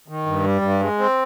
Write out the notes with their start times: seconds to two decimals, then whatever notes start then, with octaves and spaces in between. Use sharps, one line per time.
0.08 D#3
0.26 G2
0.44 G3
0.62 G2
0.80 G#3
0.99 C4